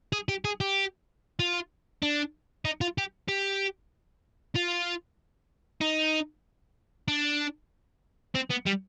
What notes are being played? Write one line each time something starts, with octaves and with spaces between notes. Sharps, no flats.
G#4
G4
G#4
G4
F4
D4
D#4
F4
G4
G4
F4
D#4
D4
C4
B3
G3